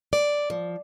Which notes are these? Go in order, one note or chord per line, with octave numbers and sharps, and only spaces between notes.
D5
F3